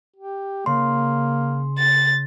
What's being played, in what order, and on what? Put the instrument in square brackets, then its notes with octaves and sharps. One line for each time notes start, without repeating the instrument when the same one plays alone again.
[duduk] G4
[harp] C#3 [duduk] A#3 [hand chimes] C6
[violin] A6